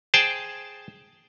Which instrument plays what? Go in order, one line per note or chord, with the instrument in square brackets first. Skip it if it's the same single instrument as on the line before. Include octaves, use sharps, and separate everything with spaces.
[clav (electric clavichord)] G#4 C5 G5 A5